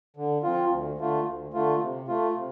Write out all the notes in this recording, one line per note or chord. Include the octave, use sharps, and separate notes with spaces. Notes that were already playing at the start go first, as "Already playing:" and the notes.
D3
F3 C4 F4
D2
D3 A3 F4
D2
D3 A3 F4
C3
A3 F4
C3